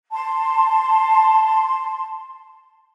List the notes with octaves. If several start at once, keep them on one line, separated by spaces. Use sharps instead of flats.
A5 C6